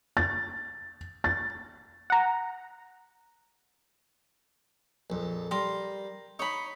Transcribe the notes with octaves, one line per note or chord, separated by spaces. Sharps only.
A6
A6
F#5 A#5
A#1 F2
G3 A#4 C6
D#4 C#5 B5